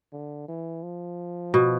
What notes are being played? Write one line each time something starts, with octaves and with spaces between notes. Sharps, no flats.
D3
E3
F3
B2